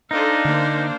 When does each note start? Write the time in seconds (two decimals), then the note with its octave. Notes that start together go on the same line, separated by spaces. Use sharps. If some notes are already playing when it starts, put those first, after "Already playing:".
0.11 D4 D#4 A4 C5 D#5 F5
0.45 D3 A#3 C5